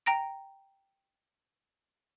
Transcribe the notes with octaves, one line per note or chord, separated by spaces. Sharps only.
G5 A#5 A#6 D7